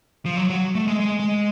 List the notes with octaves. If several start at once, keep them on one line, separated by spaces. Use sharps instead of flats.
F3
F#3
F#3
A3
G#3
G#3
G#3